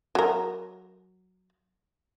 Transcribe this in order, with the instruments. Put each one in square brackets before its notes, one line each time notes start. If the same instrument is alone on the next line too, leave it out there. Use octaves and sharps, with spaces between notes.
[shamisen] F#3 A#4